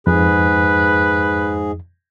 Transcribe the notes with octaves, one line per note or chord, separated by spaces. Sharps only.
F2 G#2 G#4 B4